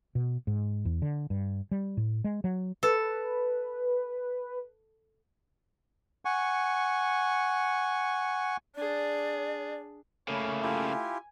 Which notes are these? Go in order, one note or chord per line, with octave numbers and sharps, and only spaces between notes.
B2
G#2
E2
D3
G2
G3
A2
G#3
F#3
A4 B4
F#5 G#5 C#6
D4 G#4 D5
C#3 A3 A#3 A4 C#5 B5
E4 F4 G4 G#5